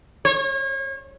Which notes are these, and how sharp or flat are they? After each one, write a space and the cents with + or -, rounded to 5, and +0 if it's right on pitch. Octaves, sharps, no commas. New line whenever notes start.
C#5 -35